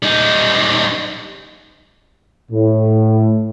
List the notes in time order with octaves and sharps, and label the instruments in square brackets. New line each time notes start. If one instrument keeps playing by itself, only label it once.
[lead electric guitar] G3 D#4
[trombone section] A2